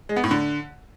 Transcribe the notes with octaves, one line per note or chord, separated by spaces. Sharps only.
G#3
B3
A2
D3